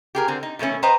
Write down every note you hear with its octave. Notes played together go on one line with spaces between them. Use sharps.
G4 G#4 A#4
D3 C4
D#4
B2 D#3 A3 C#4
B4 C5 D#5 G5 A#5